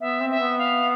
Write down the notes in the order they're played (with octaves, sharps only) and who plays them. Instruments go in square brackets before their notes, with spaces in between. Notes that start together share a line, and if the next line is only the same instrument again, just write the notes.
[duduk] B3 [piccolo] E5
[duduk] C4
[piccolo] E5
[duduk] B3
[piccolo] F5